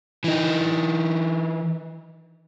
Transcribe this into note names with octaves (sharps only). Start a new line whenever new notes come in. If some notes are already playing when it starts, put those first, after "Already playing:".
E3 D#4